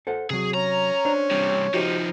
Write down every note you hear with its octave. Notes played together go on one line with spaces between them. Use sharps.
A4 C5 F#5
C3 F#3 G#4
C#4 A#5
D4 C5
G2 C3
F3 D#4 F#4 G4 C5